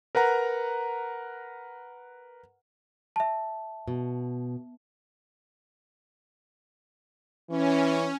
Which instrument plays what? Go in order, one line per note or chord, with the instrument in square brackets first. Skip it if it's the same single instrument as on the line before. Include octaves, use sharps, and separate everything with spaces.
[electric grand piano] A#4 B4 F#5 A#5
[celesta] E5 A5
[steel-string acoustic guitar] B2
[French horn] E3 [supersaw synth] C#4